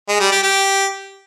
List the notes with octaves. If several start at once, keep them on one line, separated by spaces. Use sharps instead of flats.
G#3
G3
G4
G4